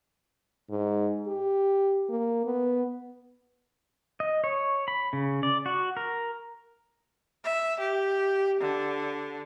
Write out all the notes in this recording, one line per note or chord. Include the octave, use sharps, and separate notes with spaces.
G#2
G4
A#3
B3
D#5
C#5
B5
C#3
D5
F#4
A#4
E5
G4
D3